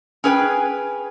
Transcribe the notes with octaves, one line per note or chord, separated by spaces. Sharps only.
C#4 G#4 B4 G5